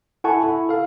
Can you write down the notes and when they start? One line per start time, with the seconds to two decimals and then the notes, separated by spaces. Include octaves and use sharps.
0.24 E4 A4 F#5 G#5 A5 C#6
0.44 E4
0.69 A4 F5